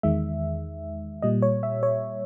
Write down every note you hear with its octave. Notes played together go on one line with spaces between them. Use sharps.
E2 D#3 G#3 E5
A#2 G3 D#5
C#5
E5
C#5